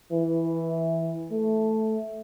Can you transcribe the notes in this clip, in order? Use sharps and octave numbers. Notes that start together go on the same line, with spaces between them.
E3
A3